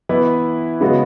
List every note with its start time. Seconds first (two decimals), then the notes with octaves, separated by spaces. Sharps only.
0.09 E3 B3 E4 B4
0.81 C#3 G#3 B3 F#4